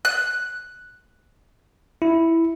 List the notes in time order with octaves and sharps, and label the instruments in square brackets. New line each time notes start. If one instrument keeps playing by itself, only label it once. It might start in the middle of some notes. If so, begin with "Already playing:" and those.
[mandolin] F#6
[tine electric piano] E4